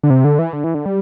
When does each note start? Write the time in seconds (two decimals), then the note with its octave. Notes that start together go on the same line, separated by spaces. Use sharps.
0.03 D3
0.10 C3
0.24 D3
0.39 E3
0.53 D3
0.64 E3
0.74 D3
0.86 G3